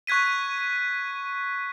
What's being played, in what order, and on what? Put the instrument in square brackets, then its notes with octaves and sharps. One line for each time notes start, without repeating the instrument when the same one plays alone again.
[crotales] C#6 F#6 G#6 B6 D#7